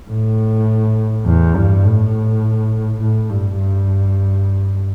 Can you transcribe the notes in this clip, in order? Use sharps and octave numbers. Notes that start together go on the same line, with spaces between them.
A2
E2
G2
A2
A2
G2
G2